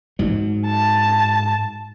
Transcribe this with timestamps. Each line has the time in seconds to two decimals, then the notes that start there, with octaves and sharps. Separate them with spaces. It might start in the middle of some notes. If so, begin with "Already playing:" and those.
0.19 G#2 F#3
0.67 A5